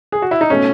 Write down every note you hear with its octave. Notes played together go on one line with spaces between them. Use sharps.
G#4
F#4
E4
D#4
B2 A3 C#4